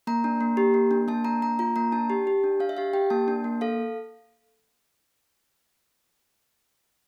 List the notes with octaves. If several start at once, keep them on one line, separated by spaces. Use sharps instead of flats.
A#3 A#5
D4
A#3
G4
A#3
D4
A#3 A5
D4 A#5
A#3 A#5
F4 A#5
A#3 A#5
D4 A5
G4
G4
D4
D4 F5
E5
G4 F5
G4 G5
A#3 A5
D4
A#3
A4 F5